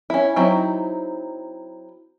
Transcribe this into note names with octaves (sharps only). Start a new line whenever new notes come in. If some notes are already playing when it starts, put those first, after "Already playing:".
C#4 E4
F#3 C4 D#4 E4